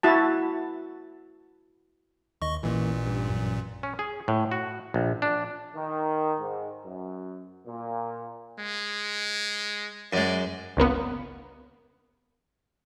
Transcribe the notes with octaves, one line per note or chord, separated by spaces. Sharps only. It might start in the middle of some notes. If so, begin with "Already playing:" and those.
E4 F#4 A5
D#2 D#5 C#6
A1 A#2 E3 A3 A#3
G2
F#2
C#4
G#4
A2
F#4
A#1
D4
D#3
G#2
F#2
A#2
G#3
F#2 G#3 D5
G1 C#2 A#3 B3